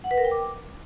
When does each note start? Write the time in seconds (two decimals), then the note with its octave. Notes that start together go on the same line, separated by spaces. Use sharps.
0.04 F#5
0.11 B4
0.18 A#4
0.25 G5
0.31 D6